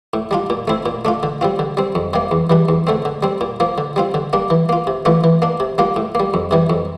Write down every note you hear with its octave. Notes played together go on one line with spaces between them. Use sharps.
A2
G3 D4 F4
A#2
A3 C4 E4
A#2
A3 D4 F4
D3
G3 C4 F4
D3
G3 C4
F2
C3 G3 A#3
E2
E3 G3 D4
E2
D3 A3 C4
D3
G3 C4
A#2
F3 A#3
D3
G3 C4 F4
D3
G3 A#3 D4
E3
A#3 F4
C3
E3 A3 D4 F4
E3
A#3 D4
C3
G3 A#3 D4 F4
A2
G3 A#3
F2
C3 E3 G3
F2